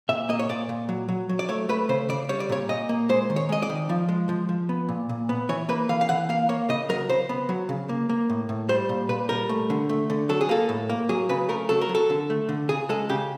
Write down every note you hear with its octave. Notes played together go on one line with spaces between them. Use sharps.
A#2 E5
A#3 D#5
C#5
A#2 D5
A#2
F#3
F#3
F#3
D5
A3 C#5
A3 B4
C#3 C5
C#3 D5
G3 C#5
D5
A#2 C#5
A#2 D#5
A#3
G#3 C5
D#3
C#5
G#3 D#5
D5
D#3
F3
G#3
F3
F3
B3
A#2
A#2
B3
E3 C#5
A#3 B4
E3 F5
F5
E3 F#5
A#3 F5
A#3 C#5
C#3 D#5
F#3 A#4
C#3 C5
B3
F#3
C#3
A#3
A#3
A2
A2
G3 C5
A#2
A#2 B4
G3 A#4
A3
D3
A3
D3
F#3 A4
G#4
A#3 A4
A2
A#3
F#3 G#4
C#3 B4
A3 A#4
F#3 A4
A#4
F#3
A4
D3
A3
D3
C#3 G#4
G#3 A4
C#3 G4